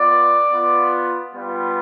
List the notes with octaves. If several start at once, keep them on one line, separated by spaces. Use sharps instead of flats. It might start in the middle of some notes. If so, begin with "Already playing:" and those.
Already playing: B3 F4 D5
B3 F4
G3 B3 F4